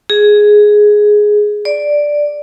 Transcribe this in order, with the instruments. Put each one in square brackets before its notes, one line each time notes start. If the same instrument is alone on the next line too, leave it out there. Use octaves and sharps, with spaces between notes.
[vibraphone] G#4
D5